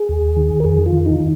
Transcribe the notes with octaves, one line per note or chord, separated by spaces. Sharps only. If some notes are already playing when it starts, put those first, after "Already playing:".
Already playing: G#4
D#2
D#3
A#4
F2 G#4
F4
D#3
D#4
D#3